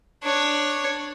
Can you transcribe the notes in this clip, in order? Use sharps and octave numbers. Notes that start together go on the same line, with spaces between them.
D4 C#5